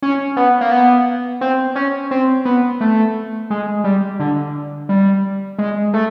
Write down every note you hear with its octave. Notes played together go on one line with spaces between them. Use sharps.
C#4
B3
A#3
B3
C4
C#4
C4
B3
A3
G#3
G3
D3
G3
G#3
A3